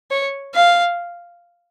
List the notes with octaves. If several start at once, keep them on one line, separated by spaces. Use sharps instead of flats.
C#5
F5